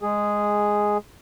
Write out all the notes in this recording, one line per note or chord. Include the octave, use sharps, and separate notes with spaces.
G#3 G#4